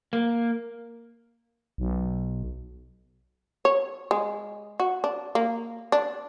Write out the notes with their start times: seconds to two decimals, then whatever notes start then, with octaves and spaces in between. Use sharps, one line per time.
0.13 A#3
1.78 B1
3.65 C#5
4.11 G#3
4.80 F#4
5.04 D4
5.35 A#3
5.92 D4